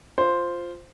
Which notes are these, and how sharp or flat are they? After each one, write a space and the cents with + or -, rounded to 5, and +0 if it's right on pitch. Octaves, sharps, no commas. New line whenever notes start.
F4 +0 C5 +0